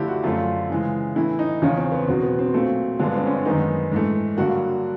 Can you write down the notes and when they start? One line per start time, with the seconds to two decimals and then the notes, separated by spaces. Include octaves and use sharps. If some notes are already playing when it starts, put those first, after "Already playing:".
Already playing: D3 F3 A3 E4 G4
0.08 F#4
0.23 F#2 D3 F3 A3 F4
0.70 C#3 E3 G#3
1.16 A2 E3 A3 E4
1.39 D#4
1.62 E2 C#3 F3 C#4
1.77 C4
1.92 B3
2.07 E2 B2 F#3 C4
2.23 B3
2.39 C4
2.54 A#2 F#3 A3 C4
2.99 G2 D3 F3 G#3
3.05 B3
3.16 C4
3.26 C#4
3.36 D4
3.45 F#2 D#3 G#3 B3 D#4
3.92 G#2 E3 A3
4.37 G2 D3 F#3 A#3 F#4